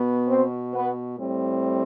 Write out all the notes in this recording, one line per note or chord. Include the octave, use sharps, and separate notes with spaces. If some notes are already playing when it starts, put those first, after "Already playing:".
Already playing: B2 B3
C4 C5
B3 B4
A2 G3 C4